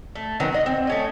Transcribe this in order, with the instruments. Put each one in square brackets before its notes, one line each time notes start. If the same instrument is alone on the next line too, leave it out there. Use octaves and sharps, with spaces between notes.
[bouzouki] A3
D#3 F#3 B3 C#4
D#5 F#5
C4
A3 C#4 D#5